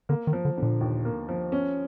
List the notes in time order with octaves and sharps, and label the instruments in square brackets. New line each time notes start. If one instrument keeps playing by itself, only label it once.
[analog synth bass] D3 [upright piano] A#3
[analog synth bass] D#3
[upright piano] F3
[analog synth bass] D3
[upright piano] D3
[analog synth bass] A#2
[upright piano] D#2
A#3
F3
C#4